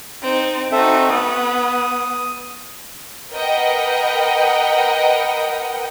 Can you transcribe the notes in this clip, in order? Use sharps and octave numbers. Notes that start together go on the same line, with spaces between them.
C4 D#4
C4 D#4 F#4 A4 E5
B3 D#6
A#4 B4 D#5 F#5 G5